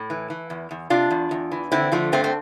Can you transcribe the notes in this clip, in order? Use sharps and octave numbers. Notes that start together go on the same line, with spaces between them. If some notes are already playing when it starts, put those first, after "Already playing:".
Already playing: A2
E3
E3
E2
E2
C3 D4 F4
E2
E2
E3
D3 C4 E4
D3 F3 A3
G2 A3 C4
C4